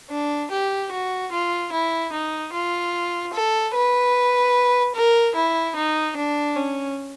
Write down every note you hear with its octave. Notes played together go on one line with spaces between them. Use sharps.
D4
G4
F#4
F4
E4
D#4
F4
A4
B4
A#4
E4
D#4
D4
C#4